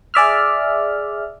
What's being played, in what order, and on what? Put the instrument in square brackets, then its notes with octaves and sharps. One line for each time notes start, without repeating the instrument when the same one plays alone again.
[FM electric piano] G#4 D5 E5 F6